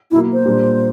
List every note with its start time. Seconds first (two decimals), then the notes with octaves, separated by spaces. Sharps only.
0.11 B2 F#3 A#3 E4
0.33 C5
0.45 A#2 G3 A#3 D4